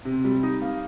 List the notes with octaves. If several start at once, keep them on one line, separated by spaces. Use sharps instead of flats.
C3 C4
G3
D#4
A#3